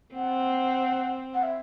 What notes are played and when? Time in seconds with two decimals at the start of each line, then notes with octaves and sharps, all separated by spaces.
0.14 C4 F#5
1.34 F#5
1.43 E5